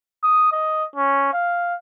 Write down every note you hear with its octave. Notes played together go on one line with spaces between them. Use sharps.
D#6
D#5
C#4
F5